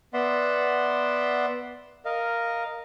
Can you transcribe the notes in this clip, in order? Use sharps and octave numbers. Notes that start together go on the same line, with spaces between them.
B3 D5 E5 F#5 C6
A#4 D#5 F5